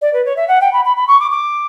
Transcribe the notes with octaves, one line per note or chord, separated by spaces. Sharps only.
D5
B4
C#5
E5
F#5
G5
B5
B5
B5
C#6
D6
D6